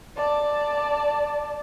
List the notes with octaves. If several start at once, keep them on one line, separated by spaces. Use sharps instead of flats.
D5 A5